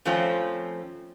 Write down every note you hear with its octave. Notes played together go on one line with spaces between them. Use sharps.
F2 F3 A3 C4 C#4